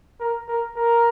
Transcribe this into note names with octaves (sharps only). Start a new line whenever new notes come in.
A#4
A#4
A#4